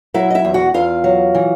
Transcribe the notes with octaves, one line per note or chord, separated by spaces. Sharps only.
F#3 E4 E5
D#5
E4 E5
E2
F#4 F#5
E2 F4 F5
F#3
E3